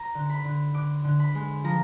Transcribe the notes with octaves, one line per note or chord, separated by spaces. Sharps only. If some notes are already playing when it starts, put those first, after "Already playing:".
Already playing: A#5
D3
B5
D3
D3 D6
D3
B5
G#3
F3 A#5